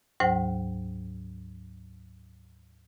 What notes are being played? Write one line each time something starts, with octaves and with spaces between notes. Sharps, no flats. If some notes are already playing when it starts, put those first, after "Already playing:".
D2 G#2 F#3 C5 F#5 G5